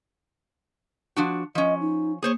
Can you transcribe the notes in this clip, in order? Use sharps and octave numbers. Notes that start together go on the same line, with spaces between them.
F3 D4 F#4
F3 C#4 D#5
D#4
A#3 G#4 C5 C#5